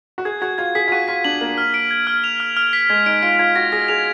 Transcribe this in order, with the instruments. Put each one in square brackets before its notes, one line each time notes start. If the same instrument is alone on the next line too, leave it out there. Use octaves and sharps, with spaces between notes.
[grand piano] F#4
[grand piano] G#4 [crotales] G#6
[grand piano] F#4 [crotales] G#6
[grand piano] F4 [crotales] G#6
[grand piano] G#4 [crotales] B6
[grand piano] F4
[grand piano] F#4 [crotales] D#7
[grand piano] F4 [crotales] B6
[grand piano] D4 [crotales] F#7
[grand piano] A#3 [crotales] F#7
[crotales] F6
D7
G#6
F6
F7
F6
F6
B6
[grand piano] G#3 [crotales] G#6
[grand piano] D#4 [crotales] D7
[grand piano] F4 [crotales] D7
[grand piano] F4 [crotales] G#6
[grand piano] F#4 [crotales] A#6
[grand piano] G#4 [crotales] A#6
[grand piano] G#4 [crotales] F7